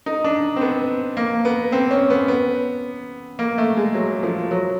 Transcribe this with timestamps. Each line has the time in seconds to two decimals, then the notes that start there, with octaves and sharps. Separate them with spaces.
0.06 D#4
0.24 D4
0.56 C4
0.61 B3
1.17 A#3
1.45 B3
1.72 C4
1.91 C#4
2.10 B3
2.28 B3
3.39 A#3
3.58 A3
3.77 G#3
3.95 F#3
4.23 F3
4.51 F#3